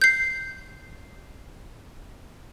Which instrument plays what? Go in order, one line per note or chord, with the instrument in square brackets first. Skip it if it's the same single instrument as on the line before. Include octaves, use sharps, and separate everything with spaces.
[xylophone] G6 C7